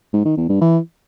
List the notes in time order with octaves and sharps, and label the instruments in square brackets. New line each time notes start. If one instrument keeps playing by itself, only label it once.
[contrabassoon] G#2
D#3
E2
G2
E3